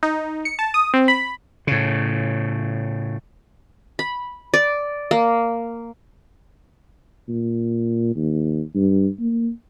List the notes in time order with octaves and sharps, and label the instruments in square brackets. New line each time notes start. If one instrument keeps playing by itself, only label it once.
[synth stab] D#4
C#7
A5
D#6
C4
B5
[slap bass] A2 C#3
[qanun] B5
D5
A#3
[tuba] A#2
D#2
G2
A#3